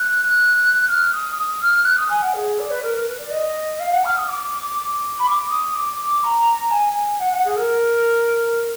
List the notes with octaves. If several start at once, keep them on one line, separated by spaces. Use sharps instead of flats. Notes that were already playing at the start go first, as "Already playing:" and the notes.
Already playing: F#6
F6
D#6
D#6
F6
F#6
D#6
G#5
F#5
G#4
D5
B4
A#4
A#4
B4
D5
D#5
F5
F#5
F6
D#6
D6
B5
D6
D#6
D6
A#5
G#5
F#5
F#5
G#4
A#4